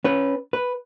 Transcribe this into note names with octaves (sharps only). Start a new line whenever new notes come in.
C#4 B4
B4